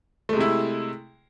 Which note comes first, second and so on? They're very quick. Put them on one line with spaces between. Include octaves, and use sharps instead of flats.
A3 G#3 C3 E4